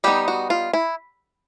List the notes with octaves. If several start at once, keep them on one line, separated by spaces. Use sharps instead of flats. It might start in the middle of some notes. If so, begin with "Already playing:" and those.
G3 B3 D#4 G4
F#4
F4
E4